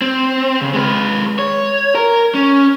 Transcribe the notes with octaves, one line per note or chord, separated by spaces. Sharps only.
C4
C#3
G#3 B4
C#5
A#4
C#4